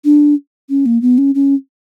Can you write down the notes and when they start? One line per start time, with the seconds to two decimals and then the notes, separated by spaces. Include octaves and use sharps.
0.05 D4
0.69 C#4
0.86 A#3
1.02 B3
1.18 C#4
1.35 C#4